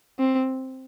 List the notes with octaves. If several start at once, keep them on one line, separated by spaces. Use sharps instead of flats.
C4